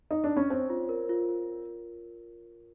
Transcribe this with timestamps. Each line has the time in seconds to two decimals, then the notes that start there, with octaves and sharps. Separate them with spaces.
0.11 D#4
0.24 D4
0.37 C#4
0.50 C4 C#5
0.70 F4
0.89 A#4
1.09 F4
1.29 F4